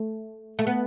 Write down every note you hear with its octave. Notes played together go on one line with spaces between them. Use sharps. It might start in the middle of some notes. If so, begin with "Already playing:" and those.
Already playing: A3
A3
B3